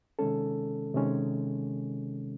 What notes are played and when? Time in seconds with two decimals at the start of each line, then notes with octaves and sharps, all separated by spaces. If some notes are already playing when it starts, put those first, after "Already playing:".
0.19 C3 D#3 G#3 C#4 A4
0.95 C3 D#3 G#3 C#4